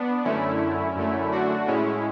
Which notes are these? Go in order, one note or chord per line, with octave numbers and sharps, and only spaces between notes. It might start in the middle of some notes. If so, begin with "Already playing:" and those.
Already playing: B3 D4
F#2 D3 A3 C#4 E4
F#2 D3 A3
D4 F#4
A2 G#3 C#4 E4